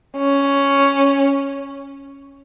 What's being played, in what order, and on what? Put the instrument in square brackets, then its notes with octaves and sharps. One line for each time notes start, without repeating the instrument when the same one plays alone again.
[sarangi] C#4